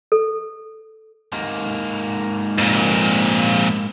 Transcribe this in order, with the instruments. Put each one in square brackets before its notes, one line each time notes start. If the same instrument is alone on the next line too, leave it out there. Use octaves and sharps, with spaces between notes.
[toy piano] A4
[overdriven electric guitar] G#2 A#3
[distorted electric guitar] F2 A#2